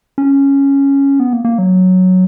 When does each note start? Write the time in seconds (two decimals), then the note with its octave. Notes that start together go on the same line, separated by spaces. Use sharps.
0.18 C#4
1.20 B3
1.33 A#3
1.45 A#3
1.58 F#3